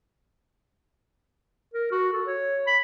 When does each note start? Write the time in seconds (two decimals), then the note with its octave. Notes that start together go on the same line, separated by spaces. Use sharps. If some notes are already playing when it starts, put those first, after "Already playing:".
1.74 A#4
1.92 F#4
2.13 A4
2.27 C#5
2.67 B5